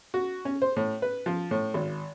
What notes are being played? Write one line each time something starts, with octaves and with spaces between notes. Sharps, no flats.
F#4
C#4
C5
A2
B4
F3
A2
G#1